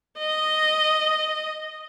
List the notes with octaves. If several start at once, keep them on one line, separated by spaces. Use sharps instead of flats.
D#5